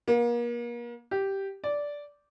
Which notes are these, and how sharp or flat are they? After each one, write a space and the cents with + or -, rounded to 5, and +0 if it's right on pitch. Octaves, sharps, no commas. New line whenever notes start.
A#3 +35
G4 -5
D5 -10